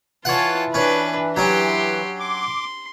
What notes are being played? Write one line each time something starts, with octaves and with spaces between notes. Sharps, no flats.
E3 F4 C#5 F#5 A5
C#4 D4 B4
F#3 C#4 G4 C6
C6 D6